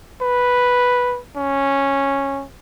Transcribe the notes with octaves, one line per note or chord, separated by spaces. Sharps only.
B4
C#4